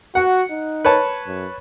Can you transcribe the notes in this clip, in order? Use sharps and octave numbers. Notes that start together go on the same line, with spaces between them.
F#4 F#5
D#4
B4 C#5 A5
F#2